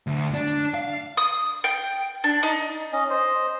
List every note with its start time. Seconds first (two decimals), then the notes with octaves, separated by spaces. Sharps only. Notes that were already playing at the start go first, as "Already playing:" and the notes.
0.07 D2
0.34 D4
0.74 F5
1.17 D#6
1.64 G5
2.24 D4
2.43 D#4
2.93 C#4 D#5
3.10 C5 D#5